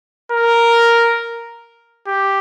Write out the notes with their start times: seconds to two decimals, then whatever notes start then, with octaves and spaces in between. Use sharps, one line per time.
0.32 A#4
2.07 G4